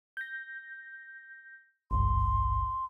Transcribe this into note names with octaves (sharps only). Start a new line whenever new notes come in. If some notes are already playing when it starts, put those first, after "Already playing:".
G6 A#6
G#1 C#2 G2 C6